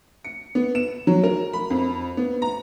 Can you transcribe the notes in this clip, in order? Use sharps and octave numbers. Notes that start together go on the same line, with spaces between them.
C#7
B3
E7
F#3
A#4
B5
F2
B3
A#5